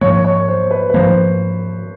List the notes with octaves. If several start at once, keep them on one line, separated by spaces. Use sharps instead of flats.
G#2 F3 A#3 C#5
C#5
C5
B4
B4
G#2 F3 A#3 C5